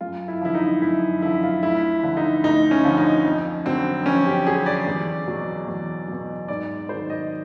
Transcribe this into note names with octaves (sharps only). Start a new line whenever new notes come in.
F#2 F4
E4
D3 F3 E4
D#4
F#2 E4
D3 F3 E4
F4
D2 E4
D3 F3
D#4
D2 D#4
C#4
D3 F3
D#4
F2
D3 F#3 C4
F2 C#4
G4
D3 F#3 G#4
D5
E2
B2 F#3
E2
B2 F#3
G#2 D5
D#3 F#3 C5
D#5